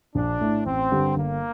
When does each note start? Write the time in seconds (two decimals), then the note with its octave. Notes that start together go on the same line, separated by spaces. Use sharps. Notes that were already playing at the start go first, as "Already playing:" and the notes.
0.15 A#1 D4
0.41 A2 A3
0.66 A1 C4
0.91 G2 D3 G3
1.16 G1 A#3